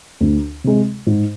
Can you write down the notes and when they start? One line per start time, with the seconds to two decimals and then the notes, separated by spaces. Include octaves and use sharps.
0.21 D2
0.64 C3 G#3
1.07 G#2